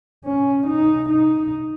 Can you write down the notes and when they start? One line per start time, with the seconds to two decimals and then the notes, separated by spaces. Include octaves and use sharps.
0.25 C#4
0.67 D#4
1.09 D#4